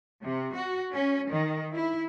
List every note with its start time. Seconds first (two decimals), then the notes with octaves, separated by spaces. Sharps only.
0.23 C3
0.55 F#4
0.92 C#4
1.30 D#3
1.73 E4